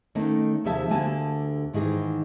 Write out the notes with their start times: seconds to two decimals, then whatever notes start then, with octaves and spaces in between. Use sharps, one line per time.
0.15 D#3 A3 A#3 C#4
0.64 D#2 C3 F3 G#4 E5 A5
0.89 D2 D3 A#3 G4 G#5 A5
1.73 G#2 D#3 E3 G#4